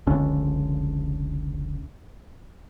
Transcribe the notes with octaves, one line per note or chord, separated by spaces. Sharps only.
F1 C#2 D3 C#4